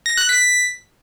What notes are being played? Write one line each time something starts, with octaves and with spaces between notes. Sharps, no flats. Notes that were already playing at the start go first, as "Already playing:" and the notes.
A#6
F#6
B6